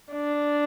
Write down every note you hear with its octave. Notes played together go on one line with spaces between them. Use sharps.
D4